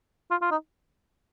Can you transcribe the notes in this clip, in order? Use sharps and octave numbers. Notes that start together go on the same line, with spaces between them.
F4
F4
D#4